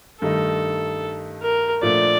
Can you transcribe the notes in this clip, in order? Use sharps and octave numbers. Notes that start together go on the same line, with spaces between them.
G2 D#3 A3 D#4 A4
A#4
A#2 F3 A3 D4 D5